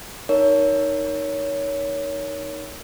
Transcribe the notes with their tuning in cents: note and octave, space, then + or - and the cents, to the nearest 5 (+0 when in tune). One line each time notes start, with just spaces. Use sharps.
D#4 +0 A#4 +0 C#5 +20